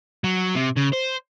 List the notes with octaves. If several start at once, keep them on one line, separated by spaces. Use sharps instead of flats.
F#3
C3
C#3
C5